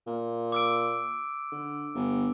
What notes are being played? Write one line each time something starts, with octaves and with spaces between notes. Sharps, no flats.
A#2
D6 E6 D7
D3
G1